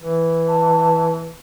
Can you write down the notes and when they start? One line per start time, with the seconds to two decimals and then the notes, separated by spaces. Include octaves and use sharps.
0.01 E3
0.48 A5